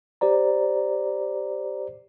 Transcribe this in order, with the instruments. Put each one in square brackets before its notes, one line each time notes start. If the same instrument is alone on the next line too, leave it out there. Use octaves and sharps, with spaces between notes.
[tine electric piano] G4 C5 D5 A#5